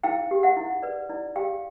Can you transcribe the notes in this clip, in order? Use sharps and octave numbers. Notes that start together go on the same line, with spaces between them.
E4 F5 G5
G4
E5 F#5
E4
B4 D5
E4 D5
G4 F5 G5